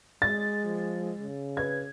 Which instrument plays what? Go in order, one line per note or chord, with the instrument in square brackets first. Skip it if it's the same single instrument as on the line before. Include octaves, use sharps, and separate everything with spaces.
[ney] G#3 [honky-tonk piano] A6
[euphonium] F3
C#3
[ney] B4 [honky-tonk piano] G#6